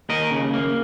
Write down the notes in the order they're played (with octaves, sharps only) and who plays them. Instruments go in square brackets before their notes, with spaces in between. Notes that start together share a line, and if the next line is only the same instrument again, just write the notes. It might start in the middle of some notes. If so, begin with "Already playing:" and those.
[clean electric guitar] D#2 A#4 D#5
C#3
A#3